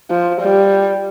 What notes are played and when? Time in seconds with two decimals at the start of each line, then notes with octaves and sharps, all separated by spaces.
0.10 F3
0.41 G3